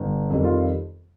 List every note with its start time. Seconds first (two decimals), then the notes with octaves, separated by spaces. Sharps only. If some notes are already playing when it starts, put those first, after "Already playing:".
Already playing: G1
0.30 F2 D#3 G3
0.44 F4